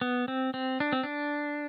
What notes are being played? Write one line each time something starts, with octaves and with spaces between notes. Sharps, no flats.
B3
C4
C4
D4
C4
D4